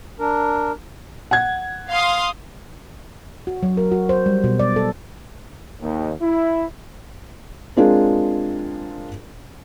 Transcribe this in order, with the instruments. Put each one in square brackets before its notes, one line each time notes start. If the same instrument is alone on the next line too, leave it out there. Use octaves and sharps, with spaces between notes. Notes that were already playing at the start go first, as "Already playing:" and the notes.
[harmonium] D4 A#4
[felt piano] F#5 G#6
[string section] F5 C6 D#6
[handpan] F#4
F#3
A#4
F#4
C5
G3
B2
D5
A4
[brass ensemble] D#2
E4
[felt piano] G#3 C4 D4 F4 G#4 A#4